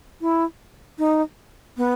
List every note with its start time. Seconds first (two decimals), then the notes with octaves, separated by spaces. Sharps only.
0.21 E4
0.99 D#4
1.77 B3